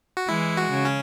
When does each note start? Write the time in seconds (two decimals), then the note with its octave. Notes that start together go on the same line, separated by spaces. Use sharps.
0.17 F#4
0.28 E3 G#3 E4
0.57 F#4
0.71 C#3
0.85 C#4